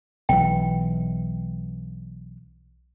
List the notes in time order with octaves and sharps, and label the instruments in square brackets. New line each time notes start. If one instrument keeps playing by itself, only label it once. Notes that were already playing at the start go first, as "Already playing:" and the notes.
[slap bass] B1 E3 [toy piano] G5